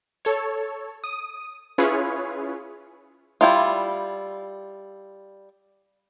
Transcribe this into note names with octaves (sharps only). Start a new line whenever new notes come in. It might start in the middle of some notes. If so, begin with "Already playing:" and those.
A4 C#5
D#6 D#7
C#4 E4 F4 G#4 B4 C#5
G3 E4 F4